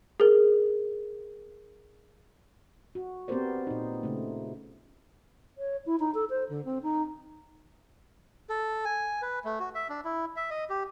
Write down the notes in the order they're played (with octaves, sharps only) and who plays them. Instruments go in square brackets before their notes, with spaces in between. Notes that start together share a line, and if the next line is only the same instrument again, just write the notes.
[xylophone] G#4 A#4
[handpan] F#4
B3 C4 G4 A#4 C5 D5
A#2 D#4
C#3 A3
[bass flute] C#5
E4
D#4
A4
C5
D3
C4
D#4
[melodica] A4
G#5
B4
A3
F#4
E5
D4
E4
E5
D#5
G4